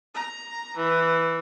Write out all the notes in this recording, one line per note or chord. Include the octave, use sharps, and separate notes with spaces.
A#5
E3